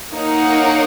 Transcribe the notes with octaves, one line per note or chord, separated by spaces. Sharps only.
A#3 D#4 A#4 C#5 F#5